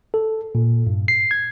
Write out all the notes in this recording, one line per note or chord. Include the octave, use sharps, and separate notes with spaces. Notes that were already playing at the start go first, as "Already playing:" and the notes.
A4
A#2
G2
C7
G#6